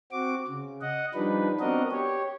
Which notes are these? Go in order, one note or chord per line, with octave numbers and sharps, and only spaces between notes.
C4 F#4 D6
C#3
D#5 F#5
F3 G3 D4 D#4 B4
B3 C4 D4 F#4 A#4 D#5
G4 C#5